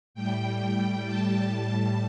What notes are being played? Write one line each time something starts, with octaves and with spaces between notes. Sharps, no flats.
A2 G3 G5
A5